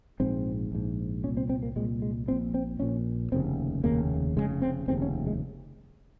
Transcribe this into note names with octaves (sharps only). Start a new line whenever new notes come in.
A#1 G#2 C4
A#1 G#2
C2 A#2 C#4
C4
C4
A#3
C2 A#2 G#3
G#3
A#1 A#2 C4
C4
A#1 A#2 C#4
F1 D#2 C#3 C4
F1 D#2 C#3 A#3
F1 D#2 C#3 G#3
C4
F1 D#2 C#3 C4
C#4
G#3